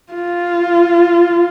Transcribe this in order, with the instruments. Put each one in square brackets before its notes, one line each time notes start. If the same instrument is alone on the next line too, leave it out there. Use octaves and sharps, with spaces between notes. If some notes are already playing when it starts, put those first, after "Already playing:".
[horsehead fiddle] F4